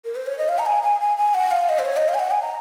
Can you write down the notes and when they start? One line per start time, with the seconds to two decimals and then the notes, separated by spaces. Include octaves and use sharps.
0.05 A#4
0.15 C5
0.26 C#5
0.38 D#5
0.48 F5
0.59 A#5
0.66 G#5
0.83 G#5
1.01 G#5
1.17 G#5
1.34 F#5
1.51 F5
1.69 D#5
1.79 C5
1.85 C#5
1.97 D#5
2.08 F5
2.14 G#5
2.19 F#5
2.31 G#5
2.42 A#5